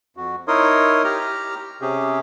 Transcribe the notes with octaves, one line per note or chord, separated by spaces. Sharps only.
F2 F#4
D#4 E4 A#4 C#5 C6 D#6
G4 A#5 F6
C3 C#4 G4 G#4